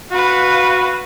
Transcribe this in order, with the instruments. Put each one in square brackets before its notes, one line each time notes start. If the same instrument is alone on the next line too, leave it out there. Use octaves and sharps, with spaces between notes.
[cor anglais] F#4 [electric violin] B4 F5